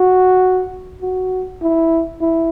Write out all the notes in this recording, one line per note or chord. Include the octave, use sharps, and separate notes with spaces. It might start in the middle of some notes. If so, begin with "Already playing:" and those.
Already playing: F#4
F#4
E4
E4